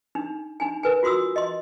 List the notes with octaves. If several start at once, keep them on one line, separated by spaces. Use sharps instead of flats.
D4 D#4
D4 D#4 G#5
A#4 B4 G#5
F4 F#4 C6 D#6 E6
D#5 C6